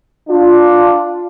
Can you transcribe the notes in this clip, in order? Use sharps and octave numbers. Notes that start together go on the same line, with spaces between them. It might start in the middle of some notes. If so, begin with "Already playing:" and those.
D4 F4